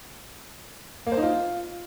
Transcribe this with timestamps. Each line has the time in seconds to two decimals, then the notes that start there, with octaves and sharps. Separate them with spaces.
1.07 A#3
1.12 C5
1.17 D#4
1.23 F4